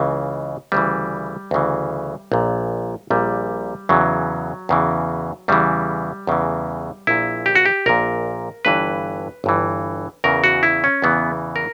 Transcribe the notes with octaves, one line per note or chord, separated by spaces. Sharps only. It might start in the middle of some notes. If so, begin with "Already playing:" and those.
Already playing: C#2 C#3 E3
D2 C#3 E3 G3
D2 C#3 E3
A#1 A#2
A#1 A#2 G3
E2 C#3 E3 F#3
E2 C#3 E3
E2 C#3 E3 G3
E2 C#3 E3
A#1 A#2 E4
G4
F#4
G4
A#1 A#2 A#4
G1 G2 E3 B4
G1 G2 E3
E2 C#3 E3 A#4
F#4
E4
C#4
E2 C#3 E3 B3
A#4